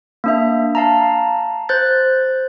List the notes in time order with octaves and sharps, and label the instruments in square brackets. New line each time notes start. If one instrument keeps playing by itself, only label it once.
[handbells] A#3 D4 E5
F5 A5 A#5
C5 F#6 G6 A6